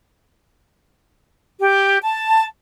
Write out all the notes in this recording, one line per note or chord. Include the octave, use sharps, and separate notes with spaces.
G4
A5